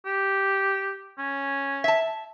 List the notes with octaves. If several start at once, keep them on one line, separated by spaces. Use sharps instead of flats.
G4
C#4
E5 A5